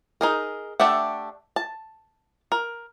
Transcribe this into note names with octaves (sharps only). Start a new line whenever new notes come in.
D#4 G#4 A#4
A3 D4 G4 E5 F#5
A5
A#4